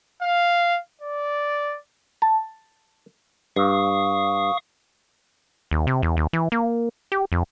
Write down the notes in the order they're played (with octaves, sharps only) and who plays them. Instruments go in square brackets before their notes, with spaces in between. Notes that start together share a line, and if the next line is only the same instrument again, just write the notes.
[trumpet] F5
D5
[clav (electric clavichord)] A5
[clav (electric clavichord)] G2 [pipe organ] F5 C#6 D#6
[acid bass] D#2
C3
E2
D#2
E3
A#3
G4
F2